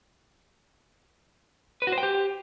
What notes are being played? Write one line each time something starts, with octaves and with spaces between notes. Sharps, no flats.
B4
F#4
C5
G5
G4